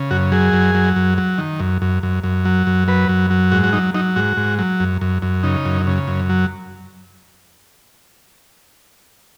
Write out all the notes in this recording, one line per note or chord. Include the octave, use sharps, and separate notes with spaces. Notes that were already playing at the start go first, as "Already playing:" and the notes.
Already playing: C#3
F#2 F#4
F#3 G#4
F#2
F#3
F#2
F#3
D#3
F#2
F#2
F#2
F#2
F#3
F#2
F#3 B4
F#2
F#3
G#2 F#4
F#4
F#3 D#4
F#3 D#4
G#2 F#4
G#2
F#3
F#2
F#2
F#2
C#3 D#4
F#2
C#3
F#2
F#3